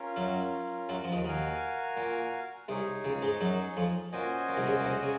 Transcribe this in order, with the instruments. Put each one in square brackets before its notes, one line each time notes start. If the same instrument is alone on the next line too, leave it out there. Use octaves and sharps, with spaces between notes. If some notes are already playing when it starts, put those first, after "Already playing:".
Already playing: [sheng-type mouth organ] C#4 F4 A#4
[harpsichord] F#2 F#3
F#2 F#3
F3
D#2 D#3
[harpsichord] D#2 D#3 [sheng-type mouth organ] F#4 A#4 F5 G#5
[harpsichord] A#2
[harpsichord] C2 C3 [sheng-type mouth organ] D#4 G#4 C#5
[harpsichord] C#2 C#3
G#2 G#3
F#2 F#3
F2 F3
[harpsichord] A#2 [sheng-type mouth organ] C#4 F#4 C5 D#5 G#5
[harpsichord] A#2
C2 C3
C#2 C#3
A#2
C2 C3
C#3